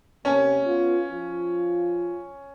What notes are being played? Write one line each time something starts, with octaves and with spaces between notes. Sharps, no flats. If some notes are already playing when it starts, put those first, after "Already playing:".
C3 A#3 C#4 G#5
B3 F4
F3 F4